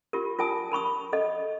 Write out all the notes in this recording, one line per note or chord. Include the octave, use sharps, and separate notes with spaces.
F4 G4 A#4
F4 A#4 G#5 A5 D#6
A#4 B5 C#6 D#6
A4 D#5